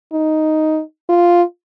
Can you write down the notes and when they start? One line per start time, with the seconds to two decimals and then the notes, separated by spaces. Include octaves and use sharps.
0.13 D#4
1.09 F4